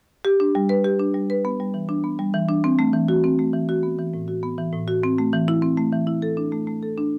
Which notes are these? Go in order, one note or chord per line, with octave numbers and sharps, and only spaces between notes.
G4
D4
G3
B4
G4
D4
G3
B4
B3
G3
E3
D4
B3
G3
E3
D4
C4
A3
E3
F#4
C4
A3
E3
F#4
B3
E3
A2
F#4
B3
E3
A2
F#4
C4
A3
E3
E4
C4
A3
E3
E4
A4
D4
A3
A3
A4
D4